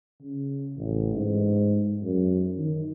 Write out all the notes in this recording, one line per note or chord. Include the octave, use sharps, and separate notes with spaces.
C#3
A1
G#2
F#2
D#3